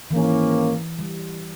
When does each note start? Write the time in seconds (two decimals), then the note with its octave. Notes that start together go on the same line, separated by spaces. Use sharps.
0.10 G#2 D#3 E3 A#3 C#4
0.99 G3